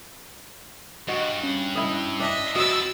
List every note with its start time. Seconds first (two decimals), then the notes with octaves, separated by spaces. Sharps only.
1.08 G2 F#4 D#5
1.44 C#4
1.75 E4 D#5
2.20 D4 D#5 E5
2.56 F2 E4 F#4 D#5 E6 A6